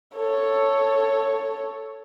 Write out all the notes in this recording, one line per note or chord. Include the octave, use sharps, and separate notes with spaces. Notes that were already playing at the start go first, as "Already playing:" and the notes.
A4 C#5